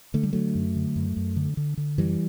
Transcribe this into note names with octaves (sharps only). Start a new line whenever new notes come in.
D3 A3
G3
D3 F#3 A3
F#2
D3
F#2
F#2
D3
D3
D3
F#2 E3 G3